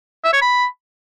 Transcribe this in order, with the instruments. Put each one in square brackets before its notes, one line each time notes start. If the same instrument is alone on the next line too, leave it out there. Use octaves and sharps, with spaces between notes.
[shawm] E5
C#5
B5